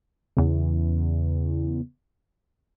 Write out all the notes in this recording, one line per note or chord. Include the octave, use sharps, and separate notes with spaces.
E2 C#3